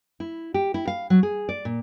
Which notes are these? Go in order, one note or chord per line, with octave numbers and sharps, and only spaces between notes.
E4
G4
E4
F5
F#3
G#4
D5
A#2